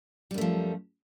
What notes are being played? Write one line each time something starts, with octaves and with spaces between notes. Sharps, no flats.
F#2 F3 G3 A3